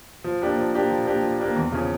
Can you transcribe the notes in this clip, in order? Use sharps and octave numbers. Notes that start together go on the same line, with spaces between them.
F3
A#3 D4 G4
F3
A#3 D4 G4
F3
A#3 D4 G4
F3
A#3 D4 G4
E2
C#3 F3 C#4